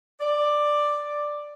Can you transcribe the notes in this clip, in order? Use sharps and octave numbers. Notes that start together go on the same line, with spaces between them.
D5